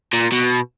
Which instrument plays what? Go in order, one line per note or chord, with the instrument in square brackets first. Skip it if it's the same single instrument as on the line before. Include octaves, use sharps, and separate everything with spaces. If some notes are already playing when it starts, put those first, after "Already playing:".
[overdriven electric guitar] A#2
B2